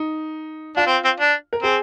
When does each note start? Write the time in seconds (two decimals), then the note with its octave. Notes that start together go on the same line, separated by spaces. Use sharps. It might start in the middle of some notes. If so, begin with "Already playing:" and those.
Already playing: D#4
0.77 D4 F4
0.87 C4
1.04 C4
1.20 D4
1.53 A#4
1.63 C4 G#4